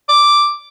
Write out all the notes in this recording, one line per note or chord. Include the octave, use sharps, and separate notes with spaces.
D6